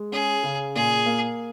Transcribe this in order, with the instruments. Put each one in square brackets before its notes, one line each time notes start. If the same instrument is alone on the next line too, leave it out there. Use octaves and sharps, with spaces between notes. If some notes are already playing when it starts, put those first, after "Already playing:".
Already playing: [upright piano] G#3
[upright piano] C#4 [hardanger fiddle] G#4
[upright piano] C#3
[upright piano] A#2 [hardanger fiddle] G#4
[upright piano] A#3